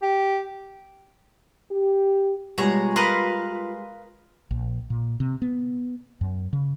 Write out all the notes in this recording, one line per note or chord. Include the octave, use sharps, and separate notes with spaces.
G4
G4
B2 G3 G#3 F4 G#4 C#5 A#5
A#4 B4 D#5 F5 C6
A#1
A#2
C3
B3
F#2
C#3